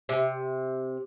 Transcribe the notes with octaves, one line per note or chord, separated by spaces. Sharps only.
C3